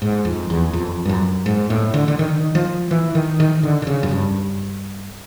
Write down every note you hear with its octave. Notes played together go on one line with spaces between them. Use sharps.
G#2
F2
E2
F2
G2
F#2
G#2
A2
D3
D3
D#3
F3
E3
D#3
D#3
D3
D3
C#3
F#2
G2